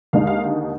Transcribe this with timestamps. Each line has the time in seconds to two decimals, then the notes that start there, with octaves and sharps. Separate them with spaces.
0.13 D#2 D3 G#3 D#4 F5
0.27 F5